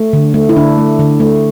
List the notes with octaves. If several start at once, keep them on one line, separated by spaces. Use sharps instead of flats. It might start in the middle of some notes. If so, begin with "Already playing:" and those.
Already playing: A3
D3
A3
E4
D3 D4
A3
D3
A3